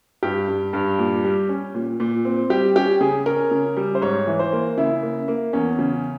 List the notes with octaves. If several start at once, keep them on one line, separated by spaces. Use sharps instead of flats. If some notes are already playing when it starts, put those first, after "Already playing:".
G2 G4
G2
G2
A#2
G3
C#4
A#2
A#2
C4
G3 G4
C#4 G4
C#3 G#4
C#4 A#4
C#3
G3
C5
G#2 C#5
E3
C5
A#3
C#3 E4
A#3
A#3
E2 C#4
C#3